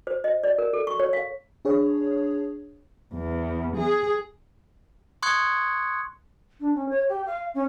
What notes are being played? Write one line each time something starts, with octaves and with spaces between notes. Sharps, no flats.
C5
D#5
D5
A#4
A4
C#6
C#5
F5
D4 G#4 C#5
E2
G#4
C6 C#6 D#6 F#6 G#6 C#7
D4
C#4
C#5
G4
F5
C#4